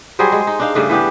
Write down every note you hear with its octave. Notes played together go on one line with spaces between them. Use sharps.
F#3 G3 G#4 C5
G#3
D#4
D4 D#4 F5
G2 C#3 A3 D4
E3 B3 D4 G4